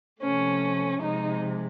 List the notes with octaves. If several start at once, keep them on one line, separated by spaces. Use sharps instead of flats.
C3 F3 A3 C#4
C3 F3 G#3 D#4